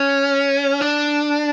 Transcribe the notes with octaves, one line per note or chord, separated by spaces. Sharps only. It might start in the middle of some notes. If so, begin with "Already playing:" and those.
Already playing: C#4
D4